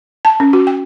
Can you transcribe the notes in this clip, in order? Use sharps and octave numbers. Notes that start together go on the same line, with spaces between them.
A5
C#4
F#4
G5